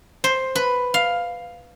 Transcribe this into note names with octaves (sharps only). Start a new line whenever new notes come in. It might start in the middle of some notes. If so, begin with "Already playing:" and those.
C5
B4
F5